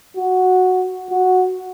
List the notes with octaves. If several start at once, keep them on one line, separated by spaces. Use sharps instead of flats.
F#4
F#4